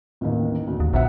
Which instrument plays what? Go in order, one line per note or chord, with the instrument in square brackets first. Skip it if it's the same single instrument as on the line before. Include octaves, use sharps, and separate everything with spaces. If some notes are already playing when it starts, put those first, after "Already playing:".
[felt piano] A1 D#2 D#3
D2
[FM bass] D#2
[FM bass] A#1 [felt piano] B2 E5 F#5